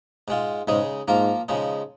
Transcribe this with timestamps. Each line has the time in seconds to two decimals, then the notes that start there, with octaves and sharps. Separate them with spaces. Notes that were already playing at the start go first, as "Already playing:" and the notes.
0.28 G#2 G#3 F4
0.68 G#2 C#3 G#3 D#4 G#4
1.08 G#2 F3 A#3 F4 A#4
1.49 C#3 F3 G#3 D#4